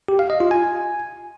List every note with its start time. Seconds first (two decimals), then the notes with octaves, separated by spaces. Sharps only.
0.08 G4
0.19 F5
0.30 D#5
0.40 F4
0.51 G#5